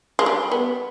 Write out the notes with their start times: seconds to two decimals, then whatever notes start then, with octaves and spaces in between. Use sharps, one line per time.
0.19 G#3
0.26 G3
0.51 B3